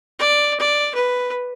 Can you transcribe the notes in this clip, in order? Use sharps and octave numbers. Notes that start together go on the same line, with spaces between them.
D5
D5
B4